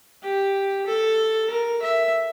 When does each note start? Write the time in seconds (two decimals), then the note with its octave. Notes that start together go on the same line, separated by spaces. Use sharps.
0.23 G4
0.86 A4
1.50 A#4
1.82 E5